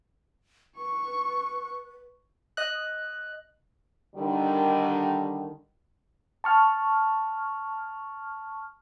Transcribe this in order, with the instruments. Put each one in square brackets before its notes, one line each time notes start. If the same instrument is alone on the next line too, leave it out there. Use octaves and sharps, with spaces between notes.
[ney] B4 [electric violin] C#6
[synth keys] D#5 F#6
[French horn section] D3 D#3 G3
[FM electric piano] A5 C#6 F6